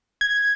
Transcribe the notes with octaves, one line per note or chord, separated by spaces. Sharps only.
G#6